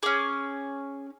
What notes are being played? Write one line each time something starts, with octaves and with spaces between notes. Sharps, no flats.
C#4 G#4 D6